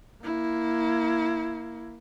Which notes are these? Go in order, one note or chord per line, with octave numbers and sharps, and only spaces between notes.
A#3 E4